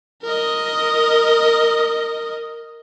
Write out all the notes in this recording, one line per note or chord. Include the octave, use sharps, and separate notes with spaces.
A#4 D#5